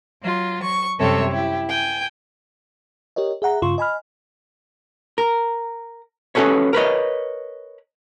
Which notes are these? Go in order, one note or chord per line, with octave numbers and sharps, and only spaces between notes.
F#3 F4
C#6
F#2 C3 G3 A4 C#5 E5
E4 G4
G5 G#5
G4 A#4 C#5 D#5
G#4 E5 F#5 A#5
G2 C#3 F4 C6 C#6
D#5 G#5 B5 F6
A#4
C#4 F#4 A4 B4 C#5
A#4 B4 C#5 D#5